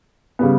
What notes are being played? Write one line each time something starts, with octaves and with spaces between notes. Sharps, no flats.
C#3 G3 B3